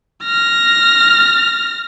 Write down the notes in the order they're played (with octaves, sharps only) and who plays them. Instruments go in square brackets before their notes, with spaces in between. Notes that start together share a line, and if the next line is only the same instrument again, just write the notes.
[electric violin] F6 A#6